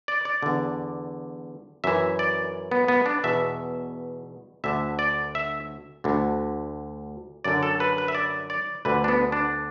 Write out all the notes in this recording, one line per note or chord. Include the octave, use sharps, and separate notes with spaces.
D5
D5
E2 D3
F#2 E3 E5
D5
B3
B3
D4
E2 B2 E5
D2 D3 E5
D5
E5
D2 D3
F#2 D3 D5
A4
B4
B4
E5
D5
D5
D2 D3 B4
D4
B3
D4